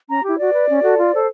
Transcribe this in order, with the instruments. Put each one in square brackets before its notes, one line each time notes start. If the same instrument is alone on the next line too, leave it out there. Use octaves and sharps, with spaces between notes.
[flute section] C#4 A#5
E4 G4
F#4 D5
B4
C#4
F#4 A4
F4
A4 C5